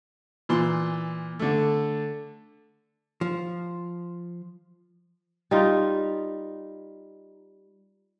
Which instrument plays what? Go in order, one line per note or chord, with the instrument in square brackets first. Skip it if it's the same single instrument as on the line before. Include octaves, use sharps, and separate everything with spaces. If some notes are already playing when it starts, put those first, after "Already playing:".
[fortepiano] A#2 E3 C6
D3 A3
[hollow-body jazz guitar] F3
[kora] G3 D#4 F4